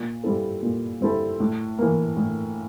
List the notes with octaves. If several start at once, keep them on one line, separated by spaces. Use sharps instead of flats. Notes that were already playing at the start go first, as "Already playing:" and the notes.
Already playing: A#2
G3 C4 E4 A4
A#2
G3 C4 E4 A4
A2
E3 A#3
A2